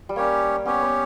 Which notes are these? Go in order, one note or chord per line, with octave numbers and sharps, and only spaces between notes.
G3
A#3 C#4 G4 C#5
B3 C#4 G4 C#5
B3